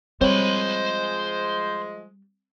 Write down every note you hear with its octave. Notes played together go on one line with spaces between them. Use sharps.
F3 G3 G#3 C4 C5 C#5 B5